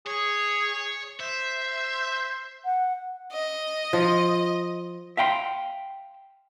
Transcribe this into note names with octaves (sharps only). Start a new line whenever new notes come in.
G#4 C#5
C5 E5
F#5
D#5
F3
E5 F5 G5 B5 C6